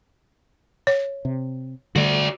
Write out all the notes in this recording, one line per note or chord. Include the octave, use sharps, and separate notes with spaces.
C#5
C3
D3 G3 A3 F#4 D5